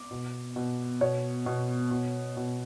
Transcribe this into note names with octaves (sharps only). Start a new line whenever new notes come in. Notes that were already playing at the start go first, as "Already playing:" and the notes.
Already playing: D6
B2
B2
B2 C#5
B2
B2
B2